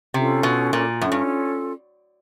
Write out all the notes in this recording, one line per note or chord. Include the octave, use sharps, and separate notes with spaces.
C3 C#4 F4 A4
B2
A#2
F#2 C#4 F4 A4
G2